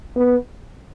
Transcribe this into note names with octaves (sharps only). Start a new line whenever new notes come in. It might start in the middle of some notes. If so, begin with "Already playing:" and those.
B3